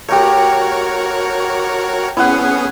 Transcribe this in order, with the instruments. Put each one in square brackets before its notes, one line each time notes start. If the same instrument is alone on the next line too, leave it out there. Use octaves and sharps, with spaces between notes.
[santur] A3 G4 [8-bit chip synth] F#4 A#4 C#5
[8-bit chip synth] B3 C#4 G#4 [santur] E4 F#5